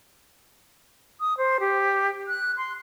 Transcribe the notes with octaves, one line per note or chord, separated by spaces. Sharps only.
D#6
C5
G4
F#6
C6